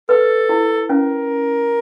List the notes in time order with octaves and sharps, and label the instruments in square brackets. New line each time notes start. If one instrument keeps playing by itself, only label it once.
[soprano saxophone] A4 [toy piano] B4
[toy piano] E4
[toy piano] C#4 [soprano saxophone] A#4